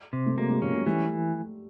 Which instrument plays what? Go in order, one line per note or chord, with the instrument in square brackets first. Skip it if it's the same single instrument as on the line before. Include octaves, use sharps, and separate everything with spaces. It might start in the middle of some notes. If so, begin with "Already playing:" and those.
Already playing: [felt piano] G3
[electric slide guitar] C3
[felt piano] A3
[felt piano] F#3 G#3 [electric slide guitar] A#3
[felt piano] F#3 G#3
[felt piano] F3 G3 [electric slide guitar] C#4
[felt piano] F#3 G#3
[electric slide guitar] E3 [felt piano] G3 A3